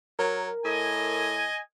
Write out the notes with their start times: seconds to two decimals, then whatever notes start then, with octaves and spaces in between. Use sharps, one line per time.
0.19 F#3 A#4
0.65 A2 D#5 G#5